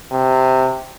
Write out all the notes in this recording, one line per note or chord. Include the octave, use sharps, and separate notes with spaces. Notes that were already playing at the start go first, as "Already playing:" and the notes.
C3